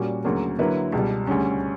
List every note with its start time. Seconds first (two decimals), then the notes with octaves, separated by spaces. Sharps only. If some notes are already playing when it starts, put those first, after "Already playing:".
Already playing: A#2 G3 C#4 F#4
0.24 D2 C#3 F#3 A#3
0.59 D3 F#3 A#3 E4 B4
0.92 C#2 B2 G3
1.27 D2 C#3 G3 C#4